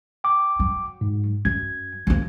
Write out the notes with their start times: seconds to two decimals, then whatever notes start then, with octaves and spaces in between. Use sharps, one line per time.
0.24 G5 D6
0.59 F#3
1.01 G#2
1.45 F#2 G#6
2.07 F3 A#3